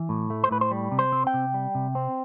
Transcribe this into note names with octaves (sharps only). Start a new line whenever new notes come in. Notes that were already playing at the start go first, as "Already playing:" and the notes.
Already playing: E3
A2
A3
C5
A2 B4
C5
G3
C3
C5
C4
G5
C3
G3
C3
C4